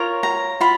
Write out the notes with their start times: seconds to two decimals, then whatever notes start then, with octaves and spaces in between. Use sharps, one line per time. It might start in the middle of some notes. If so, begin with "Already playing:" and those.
Already playing: F4 A#4 C#5
0.23 A#5
0.61 F4 B5